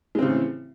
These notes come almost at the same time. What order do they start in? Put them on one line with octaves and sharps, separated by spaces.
G#3 C4 C#3 A2 E3